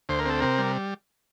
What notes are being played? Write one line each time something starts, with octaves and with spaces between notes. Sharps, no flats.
D2 C5
A#4
C4 A4
C3 A#4
G3